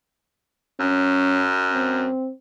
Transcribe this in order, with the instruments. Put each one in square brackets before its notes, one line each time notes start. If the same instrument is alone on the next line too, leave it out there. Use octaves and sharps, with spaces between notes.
[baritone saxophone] F#2 [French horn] C#4
[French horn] C4